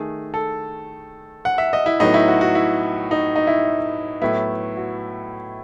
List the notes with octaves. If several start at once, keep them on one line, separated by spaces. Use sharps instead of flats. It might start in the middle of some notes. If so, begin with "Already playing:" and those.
Already playing: D#3 A3 G#4
A4
F#5
E5
D#5
E4
A2 F#3 B3 D#4
E4
F#4
F#4
E4
D#4
D#4
E4
A2 F#3 B3 E4
F#4